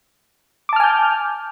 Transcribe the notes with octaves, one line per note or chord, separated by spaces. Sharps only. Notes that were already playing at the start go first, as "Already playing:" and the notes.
G#5 A5 D6 F6 G6